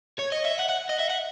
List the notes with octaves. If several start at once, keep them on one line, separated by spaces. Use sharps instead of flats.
C#5
D#5
E5
F#5
F#5
D#5
E5
F#5